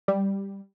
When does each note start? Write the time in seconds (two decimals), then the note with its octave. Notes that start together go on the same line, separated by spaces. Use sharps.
0.08 G3